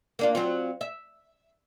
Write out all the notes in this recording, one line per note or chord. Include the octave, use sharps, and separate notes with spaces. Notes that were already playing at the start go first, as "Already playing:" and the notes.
A#3 D4 F4
F#3 C4 F4
E5